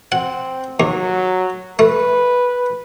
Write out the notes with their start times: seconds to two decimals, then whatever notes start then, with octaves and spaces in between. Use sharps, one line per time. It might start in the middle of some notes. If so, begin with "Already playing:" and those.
0.12 C4 F#5
0.80 D#2 F#3
1.79 A3 B4